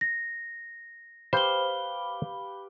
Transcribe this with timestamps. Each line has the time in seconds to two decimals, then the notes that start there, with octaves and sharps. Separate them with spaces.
0.01 A#6
1.33 G4 B4 C5 F5 B5 G7